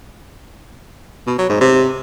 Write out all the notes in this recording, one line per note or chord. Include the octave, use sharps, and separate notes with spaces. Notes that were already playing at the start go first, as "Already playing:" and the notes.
B2
F#3
G#2
C3